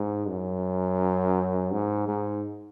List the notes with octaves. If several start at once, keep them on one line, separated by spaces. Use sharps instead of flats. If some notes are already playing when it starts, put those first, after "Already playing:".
Already playing: G#2
F#2
G#2
G#2